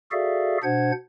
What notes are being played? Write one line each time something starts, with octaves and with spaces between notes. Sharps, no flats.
F#4 G#4 A4 D5 E5 F5
B2 D4 C5 F#5 G#6